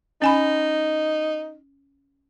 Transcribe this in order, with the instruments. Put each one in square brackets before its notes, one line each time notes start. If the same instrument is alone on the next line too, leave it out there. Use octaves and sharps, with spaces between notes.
[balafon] C#4 G#5 B5 [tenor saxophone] D#4